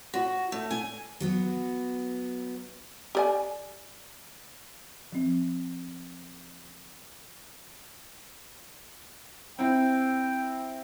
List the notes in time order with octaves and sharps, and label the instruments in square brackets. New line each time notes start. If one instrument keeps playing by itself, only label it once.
[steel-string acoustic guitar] F#4
A3
G#5
F#3 B3 F#4
[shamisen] G4 D5 G#5
[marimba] F3 C4
[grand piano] C4 E4 [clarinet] G5